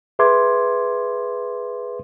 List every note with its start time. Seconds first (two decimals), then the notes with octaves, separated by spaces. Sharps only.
0.19 G#4 B4 E5 C6 D6 G#6